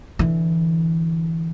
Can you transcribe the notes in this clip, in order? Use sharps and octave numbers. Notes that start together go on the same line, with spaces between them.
D3 E3